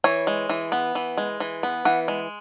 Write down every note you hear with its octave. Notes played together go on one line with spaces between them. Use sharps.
E3 C#5
G#3
E3
B3
E3
G#3
E3
B3
E3 F#5
G#3